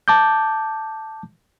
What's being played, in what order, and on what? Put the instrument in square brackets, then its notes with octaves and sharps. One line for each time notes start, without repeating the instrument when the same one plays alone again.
[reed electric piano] A5 D6 G6